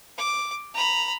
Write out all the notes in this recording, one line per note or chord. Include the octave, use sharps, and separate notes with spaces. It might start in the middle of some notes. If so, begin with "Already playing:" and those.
D6
A#5 B5